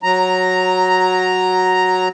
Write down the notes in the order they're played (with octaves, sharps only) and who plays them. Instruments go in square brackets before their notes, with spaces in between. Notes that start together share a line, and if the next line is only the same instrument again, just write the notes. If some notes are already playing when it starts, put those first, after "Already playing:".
[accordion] F#3 A#5